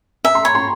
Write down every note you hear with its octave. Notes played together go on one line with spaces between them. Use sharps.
E5 G#5 A#5
A#5 C6
C#5 B5 C#6
A#5 C6